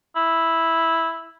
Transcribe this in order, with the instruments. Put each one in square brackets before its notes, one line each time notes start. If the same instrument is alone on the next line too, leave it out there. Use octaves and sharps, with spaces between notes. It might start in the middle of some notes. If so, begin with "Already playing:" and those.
[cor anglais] E4